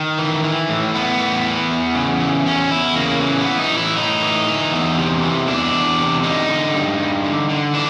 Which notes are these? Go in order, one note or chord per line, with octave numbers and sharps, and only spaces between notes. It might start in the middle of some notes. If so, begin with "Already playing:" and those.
Already playing: D#3
E3
E3
A2
A2 B3
E3
E3
E2
C#3
E3
E2 C#4
E2 E4
C#3 A#3
E3
B3
E3
D#4
A2
E4
A2 D#4
E3
E3
E2
C3
E3
E2 D4
E2
C3
D3 D#4
D3
G2
G2
D3
D3
E3 D4